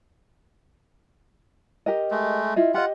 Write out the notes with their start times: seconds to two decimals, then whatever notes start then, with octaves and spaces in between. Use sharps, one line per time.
1.86 G4 A#4 D#5
2.11 G#3 A3
2.56 E4 F4 D#5
2.74 F4 G4 D#5 F#5